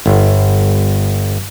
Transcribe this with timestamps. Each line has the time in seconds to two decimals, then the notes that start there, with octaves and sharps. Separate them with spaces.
0.06 G1